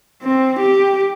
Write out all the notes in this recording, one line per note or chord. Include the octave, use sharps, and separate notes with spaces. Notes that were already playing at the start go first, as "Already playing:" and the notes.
C4
G4